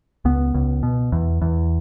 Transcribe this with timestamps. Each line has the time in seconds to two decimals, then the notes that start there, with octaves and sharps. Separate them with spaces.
0.25 C#2 B3
0.54 C#2
0.83 B2
1.12 E2
1.42 E2